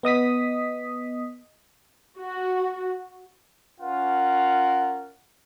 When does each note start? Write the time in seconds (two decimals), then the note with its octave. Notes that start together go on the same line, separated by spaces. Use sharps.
0.03 B3 D#5 D#6 B6
2.19 F#4
3.81 C#4 F4 A#4 F#5